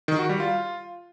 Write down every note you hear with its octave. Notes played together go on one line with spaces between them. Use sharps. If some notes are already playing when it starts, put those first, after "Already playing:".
D#3
F#4
G3
F4